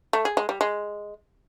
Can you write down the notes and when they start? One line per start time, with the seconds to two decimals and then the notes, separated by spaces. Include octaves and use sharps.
0.13 A3
0.25 G#4
0.37 G#3
0.49 G3
0.61 G#3